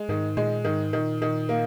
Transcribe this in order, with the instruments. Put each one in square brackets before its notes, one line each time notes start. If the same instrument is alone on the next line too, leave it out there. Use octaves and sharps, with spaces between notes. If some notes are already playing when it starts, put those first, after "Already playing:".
Already playing: [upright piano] G#3
[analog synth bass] G#2 [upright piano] D#3
[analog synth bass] A#2 [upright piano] G#3
[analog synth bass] G#2 [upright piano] D#3
[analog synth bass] A#2 [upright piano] D#3
[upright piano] D#3
A#3